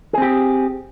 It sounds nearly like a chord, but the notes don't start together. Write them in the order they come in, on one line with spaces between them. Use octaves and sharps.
G#4 C4 G4